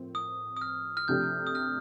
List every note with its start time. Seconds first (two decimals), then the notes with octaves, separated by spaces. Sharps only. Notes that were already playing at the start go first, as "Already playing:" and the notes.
Already playing: A2 F3 C4 A#4
0.15 D#6
0.57 D#6
0.61 F6
0.97 F6
1.08 C3 F3 A3 D4 G4 G6
1.47 D#6
1.55 F6